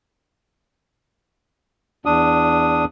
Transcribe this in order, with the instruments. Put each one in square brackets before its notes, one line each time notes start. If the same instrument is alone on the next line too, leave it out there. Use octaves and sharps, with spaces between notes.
[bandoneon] E2 D4 D#6